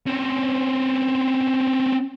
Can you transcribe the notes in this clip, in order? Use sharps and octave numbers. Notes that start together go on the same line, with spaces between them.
C4 C#4